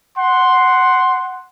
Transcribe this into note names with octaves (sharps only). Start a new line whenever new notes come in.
F#5 C6